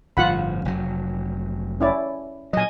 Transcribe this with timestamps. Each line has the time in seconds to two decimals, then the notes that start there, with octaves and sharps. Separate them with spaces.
0.17 G1 A2 F3 F4 F#5 B5
0.65 F1 F#3
1.80 C#4 E4 D5
2.53 A#2 F#3 D#5 G#5